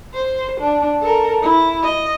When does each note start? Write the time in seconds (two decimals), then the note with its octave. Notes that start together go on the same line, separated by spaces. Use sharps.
0.13 C5
0.60 D4
1.01 A4 A#4
1.42 E4
1.82 D#5